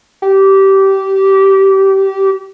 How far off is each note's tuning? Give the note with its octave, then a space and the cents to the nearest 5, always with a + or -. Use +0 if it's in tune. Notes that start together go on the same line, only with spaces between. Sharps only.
G4 -20